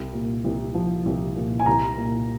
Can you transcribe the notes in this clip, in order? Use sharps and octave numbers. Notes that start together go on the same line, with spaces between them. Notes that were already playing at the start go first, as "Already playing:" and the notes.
Already playing: C2
A#2
C2
F3
C2
A#2
G#5
C2 A#5
A#2